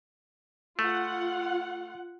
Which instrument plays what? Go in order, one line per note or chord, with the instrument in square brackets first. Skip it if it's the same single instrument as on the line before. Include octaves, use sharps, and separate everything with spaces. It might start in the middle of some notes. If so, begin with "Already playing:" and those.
[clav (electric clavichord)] A3 [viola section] F4 F#5